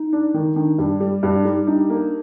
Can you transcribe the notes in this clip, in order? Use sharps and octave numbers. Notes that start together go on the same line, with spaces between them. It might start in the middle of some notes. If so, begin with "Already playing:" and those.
Already playing: D#4
D4
D#3
D#3 D4
G2 D4
G3
G2
D4
G3 D#4
D4 D#4
A#3